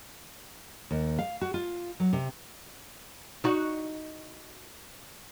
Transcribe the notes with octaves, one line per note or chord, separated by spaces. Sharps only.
D#2
F5
F#4
F4
F#3
C3
D#4 F#4